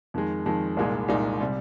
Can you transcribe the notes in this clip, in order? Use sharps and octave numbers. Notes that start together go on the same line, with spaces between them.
F2 D#3 G#3
F2 D#3 G#3
C2 A#2 G#3 D#4
C2 A#2 G#3 D#4
C3 G3